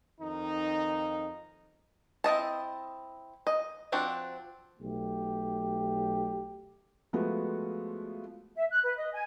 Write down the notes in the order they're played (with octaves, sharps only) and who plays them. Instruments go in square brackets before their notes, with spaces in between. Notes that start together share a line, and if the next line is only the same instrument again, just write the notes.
[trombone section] F2 D#3 D#4
[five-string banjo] C4 E4 D#5 A5
D#5
F3 C4 D4 F#4
[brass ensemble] B1 A3 G4
[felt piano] F3 G#3 A3 B3 F#4
[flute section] E5
F#6
B4
D#5
G#5